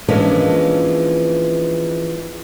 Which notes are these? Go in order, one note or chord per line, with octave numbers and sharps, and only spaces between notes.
E3 F3 G#3 A#3 C#4 D4